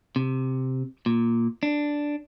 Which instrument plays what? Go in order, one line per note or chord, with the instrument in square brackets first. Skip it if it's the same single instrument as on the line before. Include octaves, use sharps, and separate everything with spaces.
[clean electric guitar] C3
A#2
D4